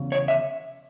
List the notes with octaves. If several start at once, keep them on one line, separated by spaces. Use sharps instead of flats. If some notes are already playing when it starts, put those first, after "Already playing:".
Already playing: E2 C#3
C#5
E5